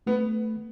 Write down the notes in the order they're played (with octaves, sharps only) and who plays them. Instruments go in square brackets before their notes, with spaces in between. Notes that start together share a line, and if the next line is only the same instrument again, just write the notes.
[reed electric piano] A3 [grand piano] B3